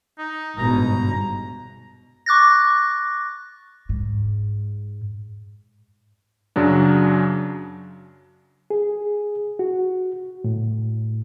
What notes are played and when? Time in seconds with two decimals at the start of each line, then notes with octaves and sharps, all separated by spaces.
0.18 D#4
0.58 G1 G#2 B2 A#5
2.26 C#6 D6 F#6 A6 A#6
3.89 G#2
6.56 F#2 C#3 F#3 D4
8.70 G#4
9.59 F#4
10.44 A2